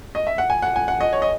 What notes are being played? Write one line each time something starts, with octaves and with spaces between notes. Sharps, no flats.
D#5
E5
F#5
G#5
F#5
G#5
F#5
D#5
C#5
D#5